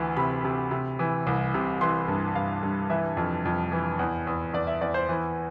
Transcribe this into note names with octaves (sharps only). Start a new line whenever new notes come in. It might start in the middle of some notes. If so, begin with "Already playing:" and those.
Already playing: D2 E3
C3 B5
C3
C3
E3
C2
C3
E3 C6
G2
G2 F5
G2
E3 E5
F2
F2
E3
E2
E2
E2 D5
E5
E2 D5
C5
E3